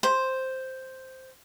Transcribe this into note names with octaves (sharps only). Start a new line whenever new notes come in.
C5